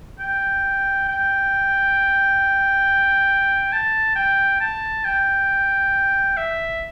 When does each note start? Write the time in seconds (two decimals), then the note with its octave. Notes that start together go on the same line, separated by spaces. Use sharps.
0.20 G5
1.09 G5
3.73 A5
4.16 G5
4.60 A5
5.05 G5
6.37 E5